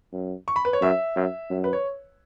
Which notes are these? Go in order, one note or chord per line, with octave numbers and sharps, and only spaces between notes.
F#2
C#6
B5
B4
C#5
F#2 E5
F#2
F#2
B4
C#5